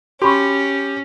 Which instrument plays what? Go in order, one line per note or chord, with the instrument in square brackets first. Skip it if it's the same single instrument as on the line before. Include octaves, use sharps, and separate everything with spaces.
[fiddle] C#4 [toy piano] F#4 B5 C#6 [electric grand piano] G4